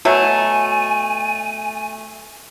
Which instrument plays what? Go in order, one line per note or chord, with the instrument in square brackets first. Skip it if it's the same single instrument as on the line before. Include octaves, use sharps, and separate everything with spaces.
[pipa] B2 F#3 A3 [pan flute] G#5